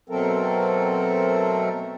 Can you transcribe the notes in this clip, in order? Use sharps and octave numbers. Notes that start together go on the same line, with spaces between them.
B2 F#3 A3 C4 A4 A#4